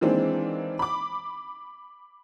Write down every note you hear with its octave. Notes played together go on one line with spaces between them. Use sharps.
D#3 E3 G#3 A#3 C4 D4
B5 D6